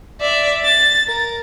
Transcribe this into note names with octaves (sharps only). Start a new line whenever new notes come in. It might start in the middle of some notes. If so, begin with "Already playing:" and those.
D5 E5
A6
A#4